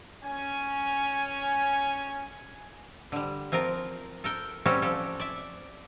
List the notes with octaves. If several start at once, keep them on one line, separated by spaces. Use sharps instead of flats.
C#4 G#5
D3 G3
F3 C4 F4 A#4
A4 A#4 G5
G3 C4 C#4 F#4 G4 A4
F3 G4 A4
D5 E5